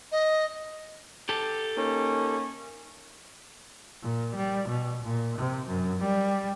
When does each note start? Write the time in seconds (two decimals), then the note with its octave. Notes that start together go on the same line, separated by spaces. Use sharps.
0.12 D#5
1.29 G4 A4
1.76 A#3 C#4 D#4
4.02 A#2
4.35 G3
4.69 B2
5.04 A#2
5.39 C3
5.67 F#2
6.02 G3